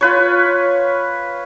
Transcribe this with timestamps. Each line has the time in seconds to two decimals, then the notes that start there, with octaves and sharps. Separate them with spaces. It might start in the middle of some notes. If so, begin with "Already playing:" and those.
0.01 F4 B4 C#5